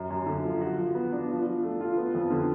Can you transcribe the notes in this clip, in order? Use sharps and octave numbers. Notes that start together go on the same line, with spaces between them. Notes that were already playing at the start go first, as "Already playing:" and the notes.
Already playing: F#2
F#2
D3
F3
F#4
F3
B3
D4
F3
F3
A3
F4
B3
F2
D3